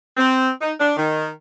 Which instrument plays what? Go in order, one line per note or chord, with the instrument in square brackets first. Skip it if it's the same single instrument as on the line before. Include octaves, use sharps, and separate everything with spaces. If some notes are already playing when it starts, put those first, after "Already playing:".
[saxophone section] C4
D#4
D4
D#3